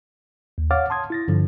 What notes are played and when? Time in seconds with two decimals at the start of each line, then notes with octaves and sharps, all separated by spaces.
0.58 D#2
0.71 C#5 F5 F#5 D6 F6 A6
0.90 A5 C6 D#6 G#6
1.10 E4 A6 A#6
1.28 G2 D3 F3